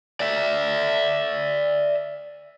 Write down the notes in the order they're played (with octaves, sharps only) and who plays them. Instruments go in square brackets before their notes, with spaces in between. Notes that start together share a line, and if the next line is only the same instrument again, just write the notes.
[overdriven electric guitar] D5 E5